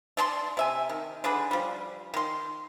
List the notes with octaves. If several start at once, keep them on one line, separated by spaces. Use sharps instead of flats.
A3 D5 A5 C6
C3 E5 G#5
D#3
D3 D4 G#4 B4
F3 G3
D#3 C6